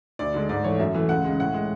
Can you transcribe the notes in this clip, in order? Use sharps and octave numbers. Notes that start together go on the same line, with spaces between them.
D2 D5
D3 G#3
G#2 D5
E3 A3 C#5
F#2 E5
E3 A3
C#2 F#5
C#3 G#3
A2 F#5
G#3